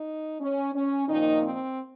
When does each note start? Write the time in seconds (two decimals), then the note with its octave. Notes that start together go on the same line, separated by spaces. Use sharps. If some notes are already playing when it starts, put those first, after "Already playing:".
Already playing: D#4
0.40 C#4
0.74 C#4
1.08 A#2 D#3 F3 A#3 D#4
1.42 C4